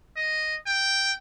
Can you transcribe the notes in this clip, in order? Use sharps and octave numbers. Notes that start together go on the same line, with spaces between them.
D#5
G5